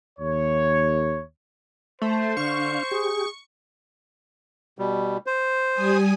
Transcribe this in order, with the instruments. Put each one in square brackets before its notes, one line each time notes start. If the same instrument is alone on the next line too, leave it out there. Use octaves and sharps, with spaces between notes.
[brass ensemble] D#2 C#5
[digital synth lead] A3 [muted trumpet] C5
[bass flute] D3 [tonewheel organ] D4 F5 [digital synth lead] C#6
[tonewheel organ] G4 [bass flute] G#4
[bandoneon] B2 G3
C5
[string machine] G3 G#5 D#6